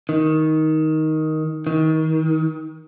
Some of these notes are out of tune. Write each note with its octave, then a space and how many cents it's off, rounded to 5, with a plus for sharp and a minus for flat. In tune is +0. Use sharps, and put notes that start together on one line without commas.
D#3 +10
D#3 +30